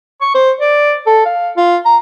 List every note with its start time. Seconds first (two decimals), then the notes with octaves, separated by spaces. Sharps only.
0.21 C#6
0.35 C5
0.61 D5
1.07 A4
1.25 F5
1.57 F4
1.86 A#5